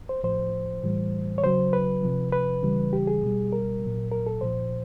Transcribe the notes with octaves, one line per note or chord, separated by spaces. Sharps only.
C5
A2 F3 C5
A2 E3 G3
C#5
C#3 F#3 C5
B4
C3 F3
B4
C#3 E3 G3
G4
G#4
B2 G3
A#4
A#2 F#3
A#4
A4
A#2 F3 C5